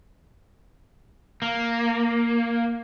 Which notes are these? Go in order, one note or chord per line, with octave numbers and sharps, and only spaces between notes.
A#3